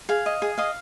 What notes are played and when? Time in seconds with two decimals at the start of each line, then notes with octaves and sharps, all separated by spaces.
0.09 G#4 F5
0.26 D#5
0.42 G#4
0.58 D#5 F5